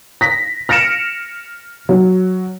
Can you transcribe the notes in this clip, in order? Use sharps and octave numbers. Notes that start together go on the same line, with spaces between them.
A#6 B6
F6 A#6 C#7 D7 E7
F#3